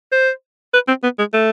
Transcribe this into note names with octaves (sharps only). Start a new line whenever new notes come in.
C5
B4
C4
B3
G#3
A3